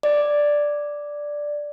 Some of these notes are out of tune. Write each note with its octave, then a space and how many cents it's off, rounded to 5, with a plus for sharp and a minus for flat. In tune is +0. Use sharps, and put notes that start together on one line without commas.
D5 +0